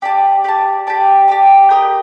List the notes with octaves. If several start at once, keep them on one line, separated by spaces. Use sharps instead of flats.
G4 D5 A5
G4 D5 A5
G4 D5 A5
G4 D5 A5
G4 A#4 D#5